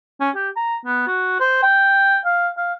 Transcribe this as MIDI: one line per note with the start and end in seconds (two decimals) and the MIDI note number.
0.20 0.30 61
0.35 0.49 67
0.56 0.77 82
0.85 1.03 59
1.07 1.40 66
1.40 1.59 72
1.63 2.18 79
2.25 2.49 77
2.58 2.73 77